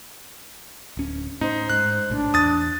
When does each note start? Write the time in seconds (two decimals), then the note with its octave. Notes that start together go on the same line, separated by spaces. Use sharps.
0.97 D1 C#4
1.41 A2 C#4 D#4 C5
1.69 G#2 F#6
2.10 A#1 A2 D4
2.34 E2 D#6 A6